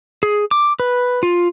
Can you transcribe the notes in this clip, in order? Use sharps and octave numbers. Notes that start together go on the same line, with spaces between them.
G#4
D6
B4
F4